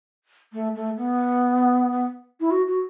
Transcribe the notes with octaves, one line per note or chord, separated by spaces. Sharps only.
A3
A3
B3
E4
F#4
F#4